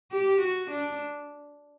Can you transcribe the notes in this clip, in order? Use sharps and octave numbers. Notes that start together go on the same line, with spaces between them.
G4
F#4
D4